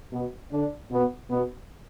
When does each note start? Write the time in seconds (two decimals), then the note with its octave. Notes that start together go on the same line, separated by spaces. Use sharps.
0.13 B2 B3
0.52 D3 D4
0.91 B2 B3
1.30 B2 B3